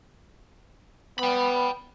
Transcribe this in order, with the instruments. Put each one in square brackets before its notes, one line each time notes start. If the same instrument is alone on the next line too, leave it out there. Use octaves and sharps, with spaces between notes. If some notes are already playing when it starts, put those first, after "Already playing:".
[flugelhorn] B3 [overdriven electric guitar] G5 B5